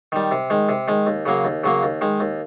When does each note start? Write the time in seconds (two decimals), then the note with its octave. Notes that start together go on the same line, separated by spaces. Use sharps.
0.12 D#3 G3
0.31 C3
0.50 D#3 G#3
0.69 C3
0.88 D#3 G#3
1.07 D#2
1.26 C#3 F#3 A#3
1.44 D#2
1.64 C#3 F#3 A#3
1.83 D#2
2.01 D#3 G#3
2.20 D#2